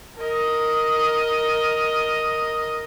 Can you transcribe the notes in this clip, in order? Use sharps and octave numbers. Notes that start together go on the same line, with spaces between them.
A#4 D#5